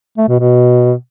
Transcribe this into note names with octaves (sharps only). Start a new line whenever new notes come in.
A3
B2
B2